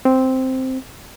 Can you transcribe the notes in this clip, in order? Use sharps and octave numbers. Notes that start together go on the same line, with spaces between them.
C4